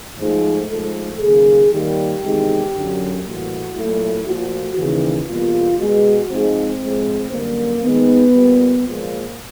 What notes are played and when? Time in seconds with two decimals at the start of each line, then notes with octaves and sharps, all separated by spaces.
0.18 G#2 F3 A3
0.68 G#2 F3 A3 A4
1.20 D#2 C#3 F#3 A#3 G#4
1.70 D#2 D#3 G3 A#3 G4
2.21 E2 C3 D#3 G#3
2.72 F#2 D3 F#3
3.23 A2 E3 G3 A#3 F#4
3.74 A#2 F#3 A3 E4
4.25 A#2 F3 A3 F#4
4.76 D#2 C#3 E3
5.27 E2 B2 G3 A#3 F4
5.77 B2 G#3 F#4
6.29 G#2 F3 G#3 C4
6.80 A2 F3 G#3
7.31 F#2 D3 G3 A#3
7.82 D#2 D#3 G#3 B3
8.32 A#2 G3 A#3
8.83 A#2 F3 G#3 A#3